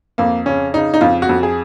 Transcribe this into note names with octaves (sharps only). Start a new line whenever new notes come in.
F2 A#3
C#3 C#4
C#3 D#4
D#4
F2 F4
F#4
F2
G#4